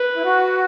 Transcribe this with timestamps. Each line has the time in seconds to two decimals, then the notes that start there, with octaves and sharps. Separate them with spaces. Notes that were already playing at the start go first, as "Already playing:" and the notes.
Already playing: B4
0.15 E4
0.24 F#4